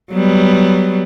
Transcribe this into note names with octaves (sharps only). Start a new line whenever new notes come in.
F#3 G3 B3